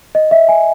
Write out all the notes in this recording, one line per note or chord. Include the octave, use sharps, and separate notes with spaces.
D#5
E5
G#5